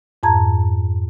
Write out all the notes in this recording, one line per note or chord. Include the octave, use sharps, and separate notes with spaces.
F2 G#2 A5 A#5 G#6